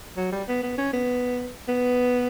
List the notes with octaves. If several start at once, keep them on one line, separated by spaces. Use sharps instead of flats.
F#3
G3
B3
B3
C#4
B3
B3